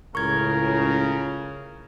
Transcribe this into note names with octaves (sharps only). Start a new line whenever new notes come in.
C#2 A2 C#3 A#4 C#6 G#6